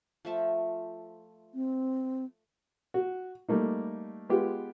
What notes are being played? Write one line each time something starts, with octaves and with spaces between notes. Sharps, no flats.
F3 A3 E5
C4
F#4
G3 A3 A#3 D#4
G#3 B3 F4 G4